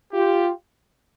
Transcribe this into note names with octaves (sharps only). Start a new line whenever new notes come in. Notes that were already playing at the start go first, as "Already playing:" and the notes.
F4 G4